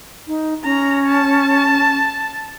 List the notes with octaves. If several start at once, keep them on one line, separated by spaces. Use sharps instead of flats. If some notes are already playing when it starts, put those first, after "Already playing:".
D#4
C#4 A#5
A5